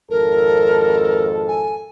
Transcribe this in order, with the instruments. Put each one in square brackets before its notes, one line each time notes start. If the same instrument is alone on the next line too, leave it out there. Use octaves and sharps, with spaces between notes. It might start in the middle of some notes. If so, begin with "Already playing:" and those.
[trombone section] G#1 F2 A4 [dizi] A#4
[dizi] G#5